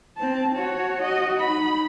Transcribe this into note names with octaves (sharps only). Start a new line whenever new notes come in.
C4 A5
F#4 C#5
F#4 D#5
D#4 B5